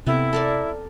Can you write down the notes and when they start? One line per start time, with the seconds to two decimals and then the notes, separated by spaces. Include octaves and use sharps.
0.07 C3 B3 C4 E4 A4
0.33 A4 A#4 D5